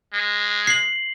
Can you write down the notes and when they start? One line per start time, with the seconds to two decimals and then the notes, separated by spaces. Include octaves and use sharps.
0.13 G#3
0.67 C7 F#7